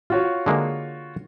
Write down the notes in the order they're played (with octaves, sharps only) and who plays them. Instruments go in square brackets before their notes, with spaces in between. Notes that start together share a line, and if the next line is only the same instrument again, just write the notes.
[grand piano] F4 F#4 C#5
[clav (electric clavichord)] D3 G#3 A#3